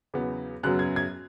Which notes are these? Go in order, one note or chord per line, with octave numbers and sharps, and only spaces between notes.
E2 C#3 F#3 B3
F#2 C#3 F#3 B3 F#6
G#6
G#6